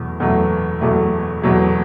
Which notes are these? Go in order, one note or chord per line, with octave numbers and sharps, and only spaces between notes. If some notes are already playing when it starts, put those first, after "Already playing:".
Already playing: E2 B2 F#3 A3
E2 B2 F#3 A3
E2 B2 F#3 A3
E2 B2 F#3 A3